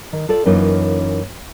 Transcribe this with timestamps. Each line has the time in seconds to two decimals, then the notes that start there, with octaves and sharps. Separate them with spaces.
0.13 D#3
0.29 F4 A4 D5
0.46 F#2 E3 A#3 C#4 D#4 F4